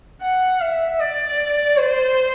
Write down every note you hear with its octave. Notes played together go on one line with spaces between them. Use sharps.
F#5
E5
D5
C5